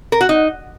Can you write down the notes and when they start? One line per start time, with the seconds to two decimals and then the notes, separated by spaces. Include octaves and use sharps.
0.12 A#4
0.21 F#4
0.29 D#4